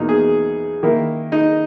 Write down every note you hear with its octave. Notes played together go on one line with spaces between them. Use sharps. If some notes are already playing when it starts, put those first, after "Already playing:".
Already playing: E2 B2 A#3 D#4
G#4
D#3 A#3 E4
D#4 D#5